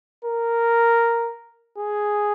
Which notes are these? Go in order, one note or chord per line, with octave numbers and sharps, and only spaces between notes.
A#4
G#4